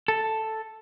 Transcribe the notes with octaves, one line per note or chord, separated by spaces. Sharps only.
A4